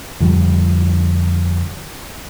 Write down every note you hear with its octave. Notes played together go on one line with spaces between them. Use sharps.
F2 D3 F3 G3